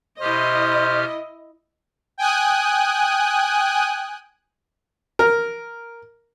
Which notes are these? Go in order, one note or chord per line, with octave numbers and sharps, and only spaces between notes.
B2 E4 G4 C5 D#5 F6
G5 G#5 D#6 F#6
A#4